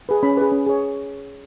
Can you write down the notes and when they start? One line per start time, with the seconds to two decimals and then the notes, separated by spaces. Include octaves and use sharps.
0.09 G#4 B4
0.23 C#4 B5
0.37 G#4 B4
0.52 C#4
0.67 G#4 C#5